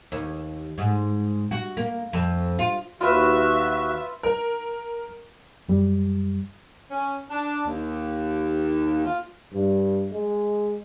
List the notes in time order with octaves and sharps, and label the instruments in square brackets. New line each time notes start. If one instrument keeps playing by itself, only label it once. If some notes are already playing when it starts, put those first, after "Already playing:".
[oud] D#2
G#2
F#4
A#3
F2
F4
[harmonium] D#2 F#4 [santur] F4 B4 [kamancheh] E5
[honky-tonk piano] A#4
[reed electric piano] F#2 G3
[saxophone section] C#4
D4
D#2
F4
[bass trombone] G2
G#3